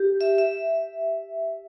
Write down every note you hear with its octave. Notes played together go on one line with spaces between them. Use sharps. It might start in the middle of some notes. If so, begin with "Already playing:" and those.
Already playing: G4
E5
E5